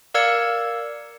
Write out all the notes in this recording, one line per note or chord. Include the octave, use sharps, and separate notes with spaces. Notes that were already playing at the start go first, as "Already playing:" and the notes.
A#4 D5 F5 E6 G#6 C#7